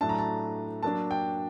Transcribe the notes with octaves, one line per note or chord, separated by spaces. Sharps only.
A2 F#3 A3 D4 A5
A#5
A5
F#3 A#3 D4 A5
G5